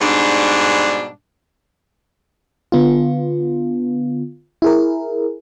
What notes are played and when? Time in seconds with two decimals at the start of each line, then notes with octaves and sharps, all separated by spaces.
0.01 G#2 B2 G3 D4
2.72 D3 B3 F4
4.62 E4 G#4 A#4